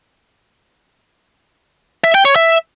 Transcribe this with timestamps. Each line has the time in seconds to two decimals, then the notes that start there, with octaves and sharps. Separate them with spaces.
2.04 E5
2.15 G5
2.25 C#5
2.36 E5